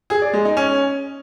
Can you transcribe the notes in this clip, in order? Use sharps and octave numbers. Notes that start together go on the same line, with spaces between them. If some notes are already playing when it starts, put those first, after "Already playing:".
G#4
D5
G#3
D#4
C#4